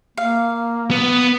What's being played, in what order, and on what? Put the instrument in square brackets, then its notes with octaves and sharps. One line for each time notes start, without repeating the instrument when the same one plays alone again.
[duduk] A#3 [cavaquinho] F5
[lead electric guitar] B3